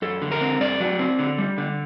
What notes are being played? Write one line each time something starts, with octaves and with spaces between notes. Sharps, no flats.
F#2 A4
D3
A#4
C4
G2 D5
F#3
C4
D3
G3
D3